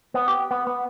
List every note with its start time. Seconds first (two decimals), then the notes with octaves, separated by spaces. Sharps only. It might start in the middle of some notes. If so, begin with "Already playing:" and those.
0.14 B3
0.28 G4
0.51 B3
0.67 B3